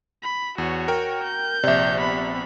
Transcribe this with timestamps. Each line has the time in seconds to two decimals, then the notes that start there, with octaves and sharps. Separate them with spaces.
0.23 B5
0.58 E2 F#4 C#5
0.88 A#4 G5
1.23 G6
1.63 A#1 C3 D5 E5
1.98 B3 B5